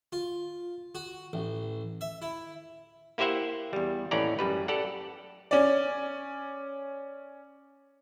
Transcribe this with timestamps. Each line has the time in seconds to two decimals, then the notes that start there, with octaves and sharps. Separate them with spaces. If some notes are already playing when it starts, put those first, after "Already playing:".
0.12 F4
0.95 F#4
1.33 A1
2.01 E5
2.22 E4
3.18 A#3 E4 G4 C5 E5 F#5
3.73 E2 G3
4.11 D#2 A2 E3 C#4 D5 A#5
4.39 F#2 G3 B4
4.68 G4 A4 D5 F#5
5.51 C#4 D5